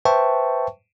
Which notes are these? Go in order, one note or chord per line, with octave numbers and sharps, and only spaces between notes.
B4 C5 E5 G5 A5 C#6